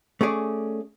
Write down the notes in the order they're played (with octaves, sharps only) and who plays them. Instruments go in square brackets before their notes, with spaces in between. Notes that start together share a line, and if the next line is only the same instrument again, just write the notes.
[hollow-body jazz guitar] A3 C#4 G#4 D5